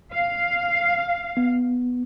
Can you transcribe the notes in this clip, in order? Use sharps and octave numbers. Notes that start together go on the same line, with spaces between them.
F5
B3